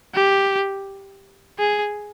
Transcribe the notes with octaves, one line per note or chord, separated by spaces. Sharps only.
G4
G#4